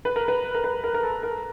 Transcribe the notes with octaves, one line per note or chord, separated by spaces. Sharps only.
B4
A#4
B4
A#4
B4
A#4
A#4
A4
A#4